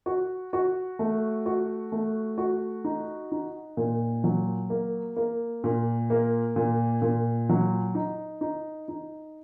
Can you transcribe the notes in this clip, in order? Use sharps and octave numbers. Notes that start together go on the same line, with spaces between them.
F#4
F#4
A3
F#4
A3
F#4
D#4
D#4
A#2
F#3
A#3
A#3
A#2
A#3
A#2
A#2
F#3
D#4
D#4
D#4